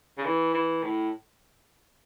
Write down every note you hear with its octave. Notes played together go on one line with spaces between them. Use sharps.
C#3
E3
E3
A2